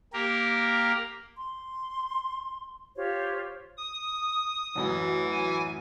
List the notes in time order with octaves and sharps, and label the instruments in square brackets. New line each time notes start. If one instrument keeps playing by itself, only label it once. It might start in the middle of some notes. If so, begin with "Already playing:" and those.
[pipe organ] A#3 G4 A#4
[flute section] C6
F4 G4 C5 C#5
[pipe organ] D#6
[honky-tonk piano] A1 F#2 F#4 [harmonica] E3
[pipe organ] G#5